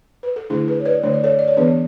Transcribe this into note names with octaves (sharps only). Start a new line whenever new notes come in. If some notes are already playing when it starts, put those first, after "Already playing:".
B4
A4
D3 A3 D4 E4 G#4
G#4 B4
C#5
B4 D5
D3 A3 D4 C#5
D5
A4 C#5
D5
C#5
E3 B3 D4 G#4 B4